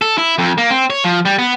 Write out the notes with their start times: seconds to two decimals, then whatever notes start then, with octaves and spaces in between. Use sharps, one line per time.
0.02 A4
0.18 E4
0.38 F2
0.58 A#3
0.70 C4
0.90 C#5
1.04 F3
1.25 G3
1.39 B3